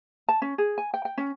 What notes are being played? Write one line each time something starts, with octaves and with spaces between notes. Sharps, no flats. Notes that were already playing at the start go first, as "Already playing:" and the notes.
A5
C#4
G#4
G#5
G5
G5
C#4